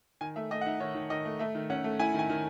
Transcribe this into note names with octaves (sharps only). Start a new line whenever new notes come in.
D#3 G#5
A3 E5
A3 D#5
F#5
D#4 E5
D#3 C#5
D#3
D#3 D#5
A3
A3 E5
D#3
C#4 F#5
A3
E4 G#5
D#3 G#5
D#3